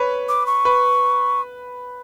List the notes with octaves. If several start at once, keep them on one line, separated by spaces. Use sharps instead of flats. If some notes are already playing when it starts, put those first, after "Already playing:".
Already playing: B4 C#5
D6
C#6
B4